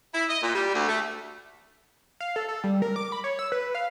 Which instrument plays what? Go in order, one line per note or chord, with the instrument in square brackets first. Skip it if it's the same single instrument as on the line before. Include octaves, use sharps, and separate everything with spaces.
[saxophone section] E4
D#5
A#2
G3
D2
A3
[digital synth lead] F5
A4
A4
G3
A#4
D6
B5
C#5
E6
B4
F5